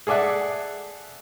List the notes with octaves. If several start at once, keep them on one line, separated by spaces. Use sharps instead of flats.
G#4 A4 D5 E5 F#5